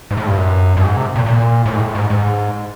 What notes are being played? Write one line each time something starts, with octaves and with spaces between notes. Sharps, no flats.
G#2
A2
G2
F#2
G2
G#2
C3
A#2
A#2
A2
G#2
A2
G#2
G#2